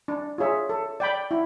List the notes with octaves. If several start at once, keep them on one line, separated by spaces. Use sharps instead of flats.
D4
F4 G#4 C#5 E5
A4
D5 G5 B5
E4